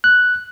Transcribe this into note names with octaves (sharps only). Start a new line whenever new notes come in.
F#6